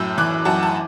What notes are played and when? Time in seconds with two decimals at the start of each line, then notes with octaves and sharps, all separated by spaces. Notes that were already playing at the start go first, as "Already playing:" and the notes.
Already playing: F#2 A2 E6 G6
0.18 E3 D6 F#6
0.45 F#2 F#5 A5
0.62 A5